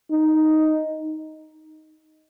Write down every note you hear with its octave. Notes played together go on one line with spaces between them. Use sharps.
D#4